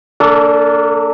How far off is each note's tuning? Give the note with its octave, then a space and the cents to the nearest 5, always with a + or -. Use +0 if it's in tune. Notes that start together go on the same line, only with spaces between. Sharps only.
A#3 -35 D4 -15 A4 +0